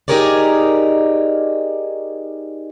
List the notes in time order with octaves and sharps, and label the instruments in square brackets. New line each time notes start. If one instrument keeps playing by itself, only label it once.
[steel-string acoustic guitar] D#4 G4 G#4 A#4 C#5 D5